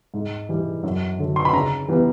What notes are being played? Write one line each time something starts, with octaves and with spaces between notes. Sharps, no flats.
G#2
E3 G3
F#2
D3 F#3
C6
B5
C#3 A#5
E3 G3 B3